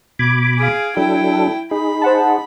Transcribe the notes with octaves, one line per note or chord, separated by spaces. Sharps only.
B2 B5 D6 G#6 D7
G#4 F5
F#3 D4 E4 A4 G5
D#4 G#4 B5
C5 F#5 A5